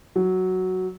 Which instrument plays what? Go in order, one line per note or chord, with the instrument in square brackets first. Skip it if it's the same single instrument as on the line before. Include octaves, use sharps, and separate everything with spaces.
[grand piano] F#3